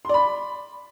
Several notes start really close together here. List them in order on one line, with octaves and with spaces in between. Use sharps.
C6 D5 B5